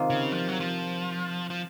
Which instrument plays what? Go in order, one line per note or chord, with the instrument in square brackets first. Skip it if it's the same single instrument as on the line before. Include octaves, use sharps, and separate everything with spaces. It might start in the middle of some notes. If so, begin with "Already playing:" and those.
Already playing: [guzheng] C3 D#3 A#3 F4
[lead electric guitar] C#3
F3
F#3
F3
F3